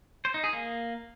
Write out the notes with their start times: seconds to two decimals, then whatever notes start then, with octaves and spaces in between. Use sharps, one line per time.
0.25 C5
0.34 D#4
0.44 G#4
0.53 A#3